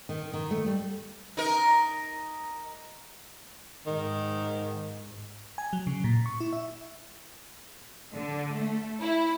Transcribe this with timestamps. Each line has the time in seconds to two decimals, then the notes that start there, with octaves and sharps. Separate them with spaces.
0.09 D#3
0.34 D#3
0.51 A3
0.66 G3
1.37 D#4 A#4
3.86 G#2 D#3
5.58 G#5
5.73 F#3
5.87 C#3
6.04 A#2
6.26 C#6
6.40 E4
6.53 E5
8.14 D3
8.55 A3
9.01 E4